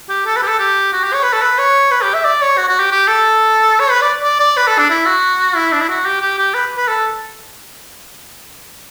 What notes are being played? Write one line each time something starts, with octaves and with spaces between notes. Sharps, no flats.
G4
A4
B4
G4
A4
G4
F#4
G4
C#5
B4
A4
B4
C#5
B4
G4
E5
D5
C#5
F#4
F#4
G4
G4
A4
C#5
B4
D5
D5
D5
B4
A4
D4
E4
F#4
E4
D4
E4
F#4
G4
G4
G4
B4
B4
A4